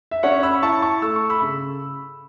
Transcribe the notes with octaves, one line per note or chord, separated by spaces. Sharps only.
E5
C#4 C#5 F#5
B5 E6
E4 A5 C#6
A5 C#6
A3 E6
C#6
B5 E6
C#3